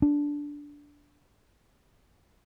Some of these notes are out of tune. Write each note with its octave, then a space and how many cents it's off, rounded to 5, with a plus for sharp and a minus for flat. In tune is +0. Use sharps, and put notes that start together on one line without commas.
D4 -10